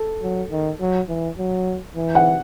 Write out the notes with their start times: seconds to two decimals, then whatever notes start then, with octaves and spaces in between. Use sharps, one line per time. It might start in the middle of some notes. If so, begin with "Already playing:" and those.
Already playing: A4
0.22 F#3
0.52 D#3
0.80 F#3
1.09 E3
1.38 F#3
1.96 E3
2.15 F#5